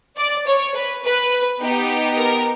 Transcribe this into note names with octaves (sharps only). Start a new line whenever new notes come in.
D5
C#5
B4
B4
B3 D#4 G4
A#4